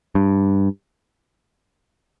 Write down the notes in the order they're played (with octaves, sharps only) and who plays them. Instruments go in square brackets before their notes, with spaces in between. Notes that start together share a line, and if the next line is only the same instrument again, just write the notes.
[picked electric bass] G2